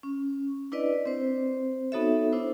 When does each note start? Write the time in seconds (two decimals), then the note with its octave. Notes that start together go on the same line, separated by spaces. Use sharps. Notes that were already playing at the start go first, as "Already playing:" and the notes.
0.03 C#4
0.72 D4 E4 B4 D5 D#5
1.06 C4 C5
1.92 B3 D#4 F#4 A4 C#5 E5
2.32 D4 E4 C5